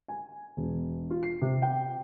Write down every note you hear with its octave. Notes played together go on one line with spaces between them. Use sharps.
G#5
E1
F4
C7
C3
G5